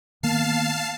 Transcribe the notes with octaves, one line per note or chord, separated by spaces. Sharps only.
D#3 A#3 B3 F5 A5 C7